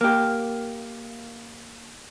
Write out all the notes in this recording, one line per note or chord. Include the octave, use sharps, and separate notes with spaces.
A#3 G4